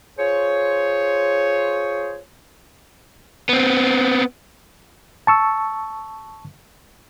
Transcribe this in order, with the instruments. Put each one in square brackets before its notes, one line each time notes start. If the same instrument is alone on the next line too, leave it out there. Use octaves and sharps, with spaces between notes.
[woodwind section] F4 G#4 C5 C#5
[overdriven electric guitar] B3 C4
[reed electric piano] A5 C#6 E6